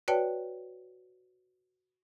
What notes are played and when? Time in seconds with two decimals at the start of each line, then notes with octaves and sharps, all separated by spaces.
0.08 F#4 B4 C#5 D5 G5 A5